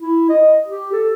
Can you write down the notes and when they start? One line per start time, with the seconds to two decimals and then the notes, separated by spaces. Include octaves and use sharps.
0.01 E4
0.29 D#5
0.67 G4
0.92 A4